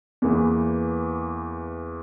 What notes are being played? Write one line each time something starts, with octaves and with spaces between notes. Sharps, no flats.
E2 E3 A#3